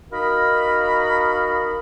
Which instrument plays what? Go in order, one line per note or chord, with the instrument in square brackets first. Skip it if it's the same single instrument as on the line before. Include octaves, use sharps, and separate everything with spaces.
[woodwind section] D#4 F#4 A#4 D#5 F5 B5